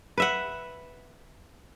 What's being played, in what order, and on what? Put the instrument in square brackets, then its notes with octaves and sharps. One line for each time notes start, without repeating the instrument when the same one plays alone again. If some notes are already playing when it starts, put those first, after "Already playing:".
[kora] B4 E5 F#5